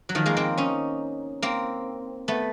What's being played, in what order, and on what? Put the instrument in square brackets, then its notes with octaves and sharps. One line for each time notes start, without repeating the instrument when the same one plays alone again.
[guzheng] F#3
D#3 F3
G#3 A#3
A#3 C4
C#4 D#4
A#3 C4
A3 B3